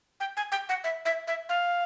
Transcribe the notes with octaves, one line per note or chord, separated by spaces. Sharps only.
G5
G#5
G5
F#5
E5
E5
E5
F5